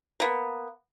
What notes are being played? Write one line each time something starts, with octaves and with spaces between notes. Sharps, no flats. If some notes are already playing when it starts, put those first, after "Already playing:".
A#3 B3